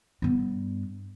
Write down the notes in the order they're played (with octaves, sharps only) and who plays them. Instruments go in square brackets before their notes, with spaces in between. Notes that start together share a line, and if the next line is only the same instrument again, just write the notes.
[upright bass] G2 B3